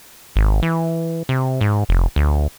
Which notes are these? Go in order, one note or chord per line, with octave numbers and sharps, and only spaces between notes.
G#1
E3
C3
G#2
F1
D2